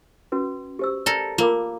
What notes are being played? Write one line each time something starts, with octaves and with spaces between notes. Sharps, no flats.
C#4 F#4 B4
G4 C5 E6
A4 A#4 D5
A#3 F4 A#4 D6